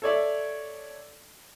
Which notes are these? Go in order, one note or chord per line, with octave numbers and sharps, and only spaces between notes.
A4 C#5 D5 E5